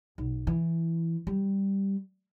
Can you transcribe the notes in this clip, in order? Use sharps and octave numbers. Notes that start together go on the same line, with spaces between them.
B1
E3
G3